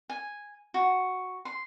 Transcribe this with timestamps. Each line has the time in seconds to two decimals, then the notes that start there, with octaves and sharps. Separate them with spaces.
0.09 G#5
0.74 F#4
1.45 C6